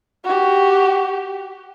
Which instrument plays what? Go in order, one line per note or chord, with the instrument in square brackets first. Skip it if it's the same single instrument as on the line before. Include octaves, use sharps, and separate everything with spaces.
[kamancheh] F#4 G4